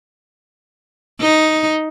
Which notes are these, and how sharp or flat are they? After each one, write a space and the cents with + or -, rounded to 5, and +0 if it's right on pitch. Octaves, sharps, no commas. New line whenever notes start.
D#4 +5